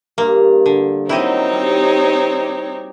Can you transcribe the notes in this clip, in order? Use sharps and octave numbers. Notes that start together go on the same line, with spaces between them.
G2 A#3
D3
D#3 F#3 C4 D#4 E4 G4 C#5 D#5
G3
D6